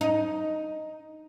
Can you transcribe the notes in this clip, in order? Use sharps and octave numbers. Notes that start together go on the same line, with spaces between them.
D#4